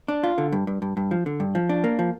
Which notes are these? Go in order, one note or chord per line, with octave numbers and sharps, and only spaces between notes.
D4
F4
D3
G2
G2
G2
G2
F3
D3
G2
F3
D4
A#3
F3